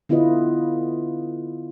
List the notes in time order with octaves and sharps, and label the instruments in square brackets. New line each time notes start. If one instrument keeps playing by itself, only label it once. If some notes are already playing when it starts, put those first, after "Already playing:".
[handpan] D3 B3 E4 F4 B4 D#5